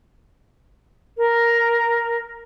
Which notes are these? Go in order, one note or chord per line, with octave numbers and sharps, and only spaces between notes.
A#4